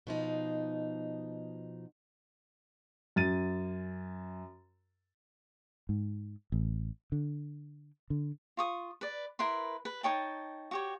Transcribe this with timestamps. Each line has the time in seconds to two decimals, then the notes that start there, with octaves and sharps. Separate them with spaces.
0.07 B2 F3 D#4
3.16 F#2 A6 D#7
5.89 G#2
6.52 A1
7.12 D3
8.10 D3
8.57 F4 C#6 D#6
9.01 B4 D5
9.39 E4 A#4 B4 C6
9.85 B4
10.03 D#4 C#5 G5 A5
10.71 F#4 G4 C#5